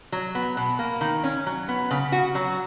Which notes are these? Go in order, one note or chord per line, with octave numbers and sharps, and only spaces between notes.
F#3
B3
B2
A#3
D#3
C#4
F#3
B3
C#3
F#4
F#3